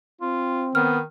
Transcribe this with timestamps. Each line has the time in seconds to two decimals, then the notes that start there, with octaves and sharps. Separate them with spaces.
0.21 C4 F4
0.75 D#3 B3 F6